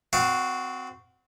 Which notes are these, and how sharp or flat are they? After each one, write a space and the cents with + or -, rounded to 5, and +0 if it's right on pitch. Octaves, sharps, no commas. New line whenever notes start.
C4 -25 F#4 +0 F5 +0